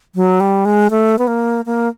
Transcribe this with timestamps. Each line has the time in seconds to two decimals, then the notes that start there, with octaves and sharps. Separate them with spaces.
0.15 F#3
0.40 G3
0.65 G#3
0.91 A3
1.19 B3
1.27 A#3
1.66 A#3